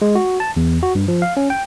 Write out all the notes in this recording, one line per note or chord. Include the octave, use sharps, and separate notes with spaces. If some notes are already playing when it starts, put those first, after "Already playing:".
G#3
F#4
A5
E2
F#4
G2
F3
F5
C#4
G5